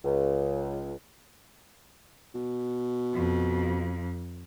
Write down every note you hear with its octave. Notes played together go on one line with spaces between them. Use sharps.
C#2
B2
F2